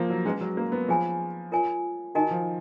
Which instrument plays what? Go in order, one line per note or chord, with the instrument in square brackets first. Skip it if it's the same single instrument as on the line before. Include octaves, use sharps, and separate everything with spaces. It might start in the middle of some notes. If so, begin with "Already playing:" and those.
Already playing: [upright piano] F3 A#3
F#3
[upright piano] G#3 [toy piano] C#4 G#4 B4
[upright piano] F#3
A#3
B3
[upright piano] F3 [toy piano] G#4 C#5 G#5 B5
[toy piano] F4 A#4 C#5 G#5
[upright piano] D#3 [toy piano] D#4 F#4 A#4 D#5 G#5
[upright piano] F3